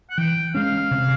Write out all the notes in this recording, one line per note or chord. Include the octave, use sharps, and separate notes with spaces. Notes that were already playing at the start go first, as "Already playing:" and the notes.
F#5
E3 G5
G#3 C#4 F5
C3